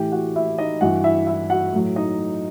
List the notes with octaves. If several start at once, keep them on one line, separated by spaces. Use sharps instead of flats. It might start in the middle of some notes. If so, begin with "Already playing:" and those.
Already playing: A2 E3 G4 G5
F#4 F#5
E4 E5
D#4 D#5
G2 E3 F#4 F#5
E4 E5
E4 E5
F#4 F#5
A2 F#3
D#4 D#5